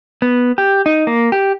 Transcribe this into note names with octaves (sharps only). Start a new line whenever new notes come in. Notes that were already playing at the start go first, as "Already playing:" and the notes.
B3
G4
D#4
A#3
G4